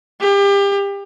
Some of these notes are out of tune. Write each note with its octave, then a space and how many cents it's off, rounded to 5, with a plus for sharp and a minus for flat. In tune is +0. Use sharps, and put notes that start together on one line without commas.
G4 +30